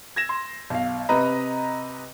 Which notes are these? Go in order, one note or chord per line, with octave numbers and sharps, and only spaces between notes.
G#6 A#6 E7
C6
B1 F5
C3 B4 D#5 A#5